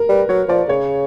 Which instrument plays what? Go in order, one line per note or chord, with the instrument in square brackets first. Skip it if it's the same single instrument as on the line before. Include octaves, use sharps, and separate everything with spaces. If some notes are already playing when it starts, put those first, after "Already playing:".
Already playing: [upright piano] A#4
[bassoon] G3 [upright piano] B4
[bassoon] F#3 [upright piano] C#5
[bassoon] F3 [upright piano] D5
[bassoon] C#3 [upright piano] C#5